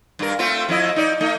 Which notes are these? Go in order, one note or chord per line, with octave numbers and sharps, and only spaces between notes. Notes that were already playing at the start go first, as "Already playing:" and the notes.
G2 A#4
A3 C4 F4
F2 E4 D#5
D#4 D5
A3 D#4